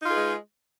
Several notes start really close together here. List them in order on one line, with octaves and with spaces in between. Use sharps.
D#4 F4 G#4 B4 G#3